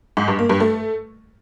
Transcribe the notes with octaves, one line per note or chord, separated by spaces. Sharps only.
G#2
G2
A#3
G2
A3